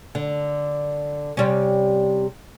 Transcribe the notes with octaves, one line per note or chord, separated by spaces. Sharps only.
D3
C3 G3 C#4